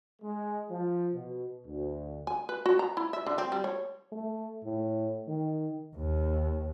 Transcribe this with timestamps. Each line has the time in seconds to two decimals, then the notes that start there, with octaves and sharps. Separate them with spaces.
0.21 G#3
0.70 F3
1.14 B2
1.66 D2
2.27 G#5
2.49 B4
2.66 F#4
2.79 A#5
2.97 E4
3.13 E5
3.26 D3
3.38 C4
3.52 G3
3.64 C#5
4.12 A3
4.64 A2
5.28 D#3
5.96 D#2